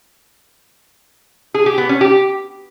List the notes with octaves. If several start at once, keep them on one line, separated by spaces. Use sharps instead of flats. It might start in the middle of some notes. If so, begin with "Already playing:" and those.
G#4
G4
B3
C#4
G4